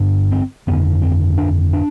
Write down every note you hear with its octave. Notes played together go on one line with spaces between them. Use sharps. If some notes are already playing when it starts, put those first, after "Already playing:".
Already playing: G1 G2 D3
C4
G1 F2 D3 B3
C4
D4
D4